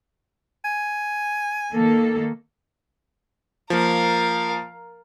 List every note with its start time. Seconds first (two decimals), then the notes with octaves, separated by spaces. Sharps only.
0.65 G#5
1.72 D#3 A#3 A4
3.70 F3 A#3 A#4 F5